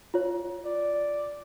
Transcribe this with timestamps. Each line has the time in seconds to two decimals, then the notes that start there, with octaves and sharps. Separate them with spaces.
0.14 F4 C#5
0.65 D5